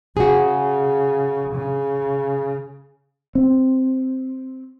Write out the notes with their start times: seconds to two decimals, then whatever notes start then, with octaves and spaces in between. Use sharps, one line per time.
0.17 C#3 F#4 G#4
1.54 C#3
3.35 C4